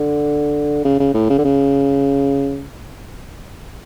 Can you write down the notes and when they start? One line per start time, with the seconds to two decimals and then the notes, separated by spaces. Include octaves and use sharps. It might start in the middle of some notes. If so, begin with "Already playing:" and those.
Already playing: D3
0.85 C#3
1.00 C#3
1.14 A2
1.30 C#3
1.38 D3
1.45 C#3